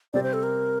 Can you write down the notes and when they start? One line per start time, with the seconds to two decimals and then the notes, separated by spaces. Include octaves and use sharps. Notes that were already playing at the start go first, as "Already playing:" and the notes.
0.14 C3 G3 C4 G4 D5
0.23 C5
0.33 A4
0.43 A#4